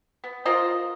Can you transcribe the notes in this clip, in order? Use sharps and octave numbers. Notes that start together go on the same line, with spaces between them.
B3
F4 A#4 C5 D#5